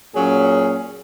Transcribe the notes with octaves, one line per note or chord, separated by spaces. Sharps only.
A#2 F#3 C#4 G#4